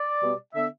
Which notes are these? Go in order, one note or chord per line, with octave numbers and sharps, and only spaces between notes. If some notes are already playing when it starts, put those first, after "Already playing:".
Already playing: D5
B2 G3 B3
D3 B3 E5